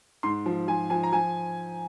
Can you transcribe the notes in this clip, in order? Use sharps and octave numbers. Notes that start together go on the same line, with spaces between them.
G#2 C6
F3
F3 G#5
F3 G#5
A#5
F3 G#5